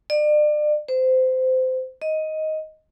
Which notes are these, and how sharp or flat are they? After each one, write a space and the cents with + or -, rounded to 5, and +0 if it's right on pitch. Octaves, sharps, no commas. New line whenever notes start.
D5 +35
C5 -20
D#5 +10